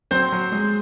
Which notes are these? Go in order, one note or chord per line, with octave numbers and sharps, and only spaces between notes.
F#3 C4 C5
F#3
G#3